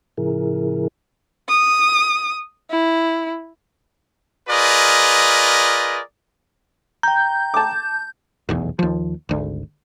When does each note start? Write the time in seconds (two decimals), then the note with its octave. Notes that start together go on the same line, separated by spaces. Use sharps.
0.18 A2 C#3 F3 E4 G#4 A#4
1.48 D#6
2.71 E4
4.49 F4 G#4 A#4 B4 D5 D#5
7.03 G5 A#5 G6
7.54 A5 D6
8.49 F1 B1 E2
8.79 D#2 F3
9.29 G#1 D2